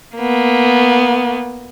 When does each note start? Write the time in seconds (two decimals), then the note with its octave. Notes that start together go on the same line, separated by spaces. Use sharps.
0.17 A#3 B3